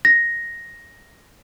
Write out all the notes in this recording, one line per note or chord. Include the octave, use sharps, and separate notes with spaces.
A#6